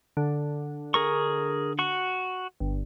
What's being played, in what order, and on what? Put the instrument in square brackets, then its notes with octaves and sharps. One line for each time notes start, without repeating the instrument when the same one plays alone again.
[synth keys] D3
[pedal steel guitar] G#4 A#4 C#6
F#4 C#6
[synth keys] G1